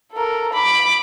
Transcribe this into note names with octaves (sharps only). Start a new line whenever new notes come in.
A4 A#4
B5 D6